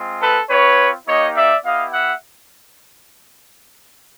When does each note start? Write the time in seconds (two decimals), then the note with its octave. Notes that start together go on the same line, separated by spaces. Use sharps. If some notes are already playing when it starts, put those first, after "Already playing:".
Already playing: G#3 C4 F4
0.21 A4 B4
0.49 C4 F4 B4 C#5
1.07 A#3 D#4 G4 C#5 D#5
1.36 D5 E5
1.64 B3 E4 G4 D#5 F5
1.93 E5 F#5